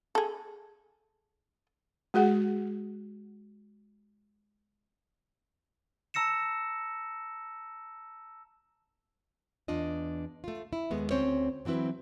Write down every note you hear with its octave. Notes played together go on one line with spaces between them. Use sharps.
G#4 A4
G#3 F#4 G#4 F#5
A5 A#5 E6 A#6 C#7 E7
E2 D4 F4 D#5
A3 F4
E4
D#2 G#3 A3 B3
D2 C4 C#4 C5 C#5
E3 F#3 C4 E4 B4